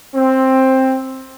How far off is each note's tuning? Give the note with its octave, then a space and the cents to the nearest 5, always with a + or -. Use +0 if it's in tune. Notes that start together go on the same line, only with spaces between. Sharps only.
C4 +10